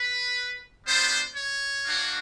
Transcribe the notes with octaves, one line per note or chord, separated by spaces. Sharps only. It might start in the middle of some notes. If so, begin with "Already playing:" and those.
Already playing: B4
G3 B3 D4 F4 C5
C#5
A#3 D4 F#4